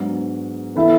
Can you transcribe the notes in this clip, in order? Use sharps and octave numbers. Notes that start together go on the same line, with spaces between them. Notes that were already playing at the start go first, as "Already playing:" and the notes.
Already playing: G#2 F#3 B3 D4
E3 B3 E4 A4 E5